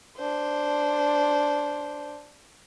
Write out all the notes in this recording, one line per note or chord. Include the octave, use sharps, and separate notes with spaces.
D4 C5